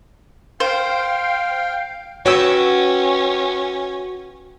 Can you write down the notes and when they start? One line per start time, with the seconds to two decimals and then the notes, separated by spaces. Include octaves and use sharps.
0.60 C5 F5 G5
2.26 C#4 F#4 B4 C#5 G5 E6